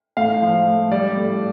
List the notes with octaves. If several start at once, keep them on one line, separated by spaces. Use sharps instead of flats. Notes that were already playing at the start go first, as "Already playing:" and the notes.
A2 F5
F3
A3
G3 D5
A2